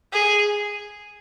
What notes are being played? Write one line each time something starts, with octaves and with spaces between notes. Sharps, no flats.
G#4